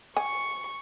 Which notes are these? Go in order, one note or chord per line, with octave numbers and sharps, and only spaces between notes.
G#5 C#6